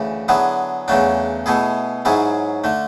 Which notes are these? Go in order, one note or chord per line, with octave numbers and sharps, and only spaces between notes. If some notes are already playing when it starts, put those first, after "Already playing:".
Already playing: D2 C#3 E3
D3 F#3 B3 E4 G#4
E2 C#3 F#3 A3 D4
B2 A3 E4 G#4
G#2 F#3 C#4 E4 G#4
D3 A3